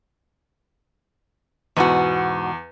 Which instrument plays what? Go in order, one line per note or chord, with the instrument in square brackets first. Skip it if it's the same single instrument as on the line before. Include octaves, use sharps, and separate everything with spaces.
[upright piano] E2 [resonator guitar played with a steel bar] G#2 B2 F#4